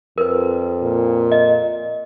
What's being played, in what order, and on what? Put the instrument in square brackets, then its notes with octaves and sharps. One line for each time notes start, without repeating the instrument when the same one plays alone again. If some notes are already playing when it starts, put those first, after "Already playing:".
[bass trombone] F2 [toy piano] A#4 B4
[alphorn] A#2
[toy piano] D#5